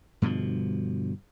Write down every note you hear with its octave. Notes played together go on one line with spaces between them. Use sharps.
G2 B2 D3 F3